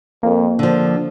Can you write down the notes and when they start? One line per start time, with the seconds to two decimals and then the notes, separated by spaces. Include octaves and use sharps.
0.23 F2 A#3
0.59 D3 F3 D4